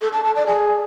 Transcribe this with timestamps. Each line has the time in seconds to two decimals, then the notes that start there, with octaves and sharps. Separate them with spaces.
0.02 A4
0.13 A5
0.24 A5
0.36 D5
0.47 G#4